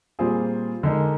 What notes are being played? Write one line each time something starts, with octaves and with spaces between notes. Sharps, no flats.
A#2 G3 C4 F4 G#4
D3 G#3 D#4 A#4